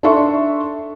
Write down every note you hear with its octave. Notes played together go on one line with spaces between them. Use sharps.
D4 D#4 A4 E5 C6 C#6